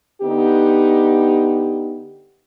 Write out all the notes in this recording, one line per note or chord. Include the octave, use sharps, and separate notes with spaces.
D3 B3 D#4 G4